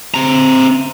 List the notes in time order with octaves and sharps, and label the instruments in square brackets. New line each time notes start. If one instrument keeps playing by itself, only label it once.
[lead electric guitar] C4 A#5